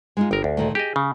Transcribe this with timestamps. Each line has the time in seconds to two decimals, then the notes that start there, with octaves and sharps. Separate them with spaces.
0.17 G#3 D#4 F4
0.31 G1 A#4 G5
0.44 D2
0.57 A#2 D#3 A3
0.75 G4 G#4 D#5
0.96 C#3